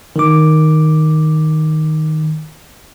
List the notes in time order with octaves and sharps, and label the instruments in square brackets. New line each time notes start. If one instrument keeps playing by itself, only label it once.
[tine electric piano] D#3 D6